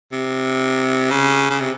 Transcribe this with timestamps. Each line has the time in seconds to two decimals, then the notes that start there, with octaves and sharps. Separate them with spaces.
0.12 C3
1.10 C#3
1.50 C#3
1.61 C3